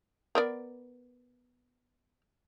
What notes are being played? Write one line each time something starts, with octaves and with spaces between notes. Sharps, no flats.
B3 A#4 D5